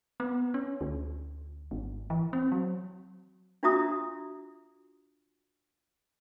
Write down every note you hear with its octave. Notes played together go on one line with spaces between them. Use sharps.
B3
C#4
D2
G#1
E3
C4
F#3
D4 F4 F#4 E5 A#5 D#6